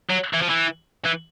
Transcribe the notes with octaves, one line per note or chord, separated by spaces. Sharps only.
F#3
E3
F3
E3
E3